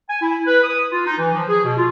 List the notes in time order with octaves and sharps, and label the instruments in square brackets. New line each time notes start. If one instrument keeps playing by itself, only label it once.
[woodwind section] G#5
E4
B4
D#6
F4
D#4
E3
F3
G#4
B2
F4